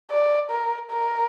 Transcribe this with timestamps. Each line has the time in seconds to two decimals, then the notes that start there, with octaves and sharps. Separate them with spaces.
0.11 D5
0.51 A#4
0.91 A#4